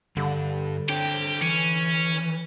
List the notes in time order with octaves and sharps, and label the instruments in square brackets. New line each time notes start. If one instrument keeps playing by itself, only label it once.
[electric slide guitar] G2 G3 [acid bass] D3
[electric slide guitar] D4 C#5 G5 [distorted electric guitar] G4
[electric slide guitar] E3 [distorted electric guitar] C#4